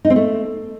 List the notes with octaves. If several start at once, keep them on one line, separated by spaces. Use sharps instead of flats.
D#4
C4
A3